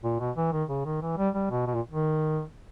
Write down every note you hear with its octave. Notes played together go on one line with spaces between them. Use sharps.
A#2
B2
E3
D#3
C#3
D#3
E3
G3
G3
B2
B2
A#2
D#3